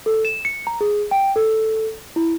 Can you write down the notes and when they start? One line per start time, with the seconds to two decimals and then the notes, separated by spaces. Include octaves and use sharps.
0.06 A4
0.25 E7
0.45 C#7
0.67 A#5
0.81 G#4
1.11 G5
1.36 A4
2.16 E4